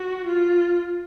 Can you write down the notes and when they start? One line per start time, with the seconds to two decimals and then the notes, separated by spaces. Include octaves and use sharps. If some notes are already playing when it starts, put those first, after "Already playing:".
Already playing: F#4
0.26 F4